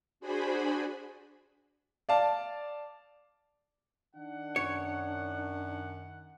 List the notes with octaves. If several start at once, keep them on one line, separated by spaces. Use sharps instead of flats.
D4 F#4 G#4 C5 G#5 B5
D5 F5 A5
D#3 D4 F#5
F#2 C#5